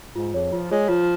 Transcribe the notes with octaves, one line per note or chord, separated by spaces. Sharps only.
G#2 F4
F2 G#4 C#5
F3 F4
G#3 G#4 C#5
F3 F4